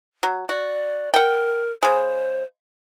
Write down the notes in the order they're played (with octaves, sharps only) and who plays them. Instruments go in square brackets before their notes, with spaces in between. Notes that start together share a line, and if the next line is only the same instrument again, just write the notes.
[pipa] F#3
[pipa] F#4 [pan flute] D5
[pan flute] A#4 [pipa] F#5 G5
[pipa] C#3 G#3 [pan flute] C5